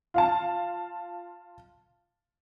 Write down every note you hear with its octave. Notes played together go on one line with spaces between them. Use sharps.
F4 F5 A5